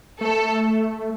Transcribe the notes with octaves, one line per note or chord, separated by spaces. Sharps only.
A3 A4